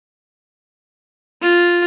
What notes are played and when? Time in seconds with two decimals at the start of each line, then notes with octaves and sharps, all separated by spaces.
1.41 F4